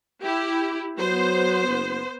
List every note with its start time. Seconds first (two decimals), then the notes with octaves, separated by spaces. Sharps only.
0.21 E4 G4
0.99 F#3 B3 C5
1.68 F#1